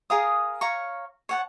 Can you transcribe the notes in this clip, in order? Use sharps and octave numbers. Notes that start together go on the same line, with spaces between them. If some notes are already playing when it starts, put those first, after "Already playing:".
G#4 A#4 F5 D#6
C#5 F5 A#5 C#6
C#5 F#5 A5